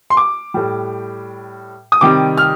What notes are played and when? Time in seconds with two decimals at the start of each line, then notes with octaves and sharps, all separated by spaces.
0.10 C6
0.17 D6
0.54 A2 G3
1.92 D#6
2.01 C3 D#3 G3 D6
2.37 F6